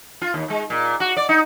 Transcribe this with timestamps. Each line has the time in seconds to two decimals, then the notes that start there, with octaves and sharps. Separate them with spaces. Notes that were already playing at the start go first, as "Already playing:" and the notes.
0.21 F4
0.34 D#2
0.50 G#3
0.70 A#2
1.00 F#4
1.17 D5
1.29 D#4